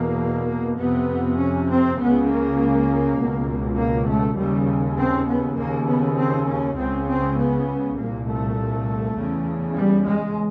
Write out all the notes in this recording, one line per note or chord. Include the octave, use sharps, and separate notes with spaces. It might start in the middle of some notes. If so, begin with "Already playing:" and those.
Already playing: E2 B2 A#3
F2 C3 B3
C#4
C4
C#2 C#3 B3
A#3
C#2 B2
A#3
A3
D#2 C#3 G3
C4
B3
D#2 C#3 A#3
B3
C4
C#4
C#2 C#3 C4
C4
B3
C2 A#2 A#3
A3
E2 C#3
G3
G#3